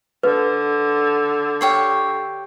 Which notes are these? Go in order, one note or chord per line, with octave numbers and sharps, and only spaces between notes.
D3 B4
G4 C#5 F5